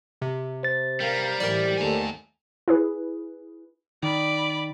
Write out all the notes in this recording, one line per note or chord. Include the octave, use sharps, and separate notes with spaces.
C3
C5 A6
G3 A#4 F5
A2 E3 G4 A#4 D5
D#2 A3 A4 G#5 A#5
E4 G#4 B4
D#3 D5 B5